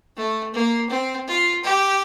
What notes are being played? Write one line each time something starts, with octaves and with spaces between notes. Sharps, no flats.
A3
A#3
C4
F4
G4